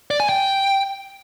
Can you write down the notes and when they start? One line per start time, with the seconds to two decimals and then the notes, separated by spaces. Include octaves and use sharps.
0.11 D5
0.20 G#5
0.29 G5